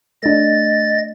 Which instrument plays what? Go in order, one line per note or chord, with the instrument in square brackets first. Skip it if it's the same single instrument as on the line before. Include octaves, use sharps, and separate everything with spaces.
[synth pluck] A3 D4 [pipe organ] D#5 A6